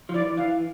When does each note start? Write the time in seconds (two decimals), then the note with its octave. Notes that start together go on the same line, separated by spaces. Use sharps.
0.09 F3
0.14 E3 D5
0.37 E3 F5